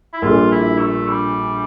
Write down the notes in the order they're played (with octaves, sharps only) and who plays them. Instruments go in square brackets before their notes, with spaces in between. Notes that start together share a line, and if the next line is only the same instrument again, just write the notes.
[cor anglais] E4
[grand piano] A#1 A#2 G3 D4 A4 [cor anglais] F4
[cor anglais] E4
A3
G3